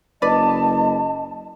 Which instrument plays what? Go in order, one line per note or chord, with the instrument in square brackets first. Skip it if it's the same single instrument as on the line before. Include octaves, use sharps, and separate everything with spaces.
[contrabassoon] F#1 [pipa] B4 D5 [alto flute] D#5 [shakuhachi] A5